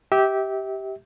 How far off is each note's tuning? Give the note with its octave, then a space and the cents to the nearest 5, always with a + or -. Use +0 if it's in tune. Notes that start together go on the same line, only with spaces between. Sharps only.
G4 -10 E5 -30